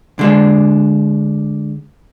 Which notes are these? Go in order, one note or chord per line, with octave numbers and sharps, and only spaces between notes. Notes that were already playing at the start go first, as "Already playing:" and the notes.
D3 G#3 D4